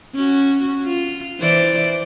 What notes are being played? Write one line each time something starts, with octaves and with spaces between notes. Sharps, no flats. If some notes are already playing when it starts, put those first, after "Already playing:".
C#4 F#4
F4
E3 C5 D5